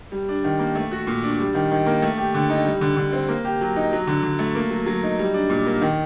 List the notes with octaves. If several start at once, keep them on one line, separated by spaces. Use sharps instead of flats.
G3
D4
D#3
A#3
A3
F#4
A#2
D4
G3
D#3
D#3
A#3
A3
G4
D3
D#4
G3
D3
D3
C4
A#3
G4
F#3
D#4
F#3
D3
D3
A3
A#3
F#3
F#3
D#4
G3
D4
A#2
A#3
D#3